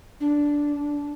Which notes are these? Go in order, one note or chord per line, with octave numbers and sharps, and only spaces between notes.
D4